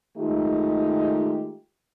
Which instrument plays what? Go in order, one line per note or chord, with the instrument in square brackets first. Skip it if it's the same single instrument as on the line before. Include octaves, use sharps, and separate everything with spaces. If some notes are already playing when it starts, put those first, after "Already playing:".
[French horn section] D#3 G#3 A3 D#4 F4 G4